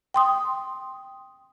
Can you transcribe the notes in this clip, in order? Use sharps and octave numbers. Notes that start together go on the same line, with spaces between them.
G5 C6 D#6